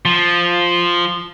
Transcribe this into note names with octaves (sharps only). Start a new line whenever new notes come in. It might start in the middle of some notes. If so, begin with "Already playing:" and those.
F3